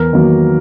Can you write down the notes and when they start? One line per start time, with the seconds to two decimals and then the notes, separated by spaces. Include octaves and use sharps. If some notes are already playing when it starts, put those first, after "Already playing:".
Already playing: E2 A#4
0.13 D#3 F#3 A#3